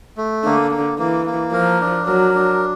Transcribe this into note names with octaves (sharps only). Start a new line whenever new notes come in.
A3
D3 A#3
A#3
E3 A#3
A#3
F3 A#4
D4
F#3 A#4
D4